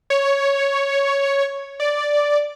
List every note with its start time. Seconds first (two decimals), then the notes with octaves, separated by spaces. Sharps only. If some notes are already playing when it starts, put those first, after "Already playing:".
0.10 C#5
1.80 D5